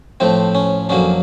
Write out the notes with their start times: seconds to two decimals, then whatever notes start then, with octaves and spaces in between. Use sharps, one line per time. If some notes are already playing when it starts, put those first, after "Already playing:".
0.20 A2 F3 A3 C4
0.55 C#4
0.89 F2 D3 F#3 A#3 C#4